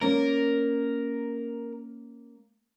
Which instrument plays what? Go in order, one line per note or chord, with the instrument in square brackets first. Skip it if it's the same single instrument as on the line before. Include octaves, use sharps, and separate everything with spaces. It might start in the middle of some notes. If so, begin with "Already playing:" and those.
[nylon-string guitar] A#3 C#4 D5 [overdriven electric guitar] A#4